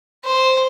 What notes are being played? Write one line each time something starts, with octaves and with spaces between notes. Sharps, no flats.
C5